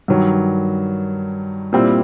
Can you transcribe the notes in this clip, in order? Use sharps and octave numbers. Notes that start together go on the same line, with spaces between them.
G2 D#3 F#3
A#2 G3 C4 E4